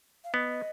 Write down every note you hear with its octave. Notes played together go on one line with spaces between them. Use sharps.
F5
B3 D#5